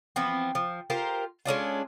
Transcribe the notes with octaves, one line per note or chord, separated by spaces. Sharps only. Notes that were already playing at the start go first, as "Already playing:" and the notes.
E3 F3 B3 C4
F3
F4 G4 A#4 C5
G#3 C#4 D4 F4